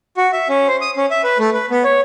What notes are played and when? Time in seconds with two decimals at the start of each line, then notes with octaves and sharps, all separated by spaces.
0.17 F#4
0.33 E5
0.49 C#4
0.68 C5
0.81 D#6
0.97 C#4
1.11 E5
1.24 B4
1.39 A3
1.54 B4
1.70 B3
1.84 C#5